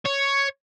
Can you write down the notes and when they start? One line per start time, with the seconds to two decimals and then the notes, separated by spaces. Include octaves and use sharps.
0.06 C#5